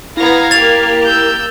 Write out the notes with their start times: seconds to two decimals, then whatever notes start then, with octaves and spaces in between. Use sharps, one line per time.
0.17 B3 E4 F5 A#5 G#6 A#6
0.51 A#3 G4 A6 F7
1.06 E6 G6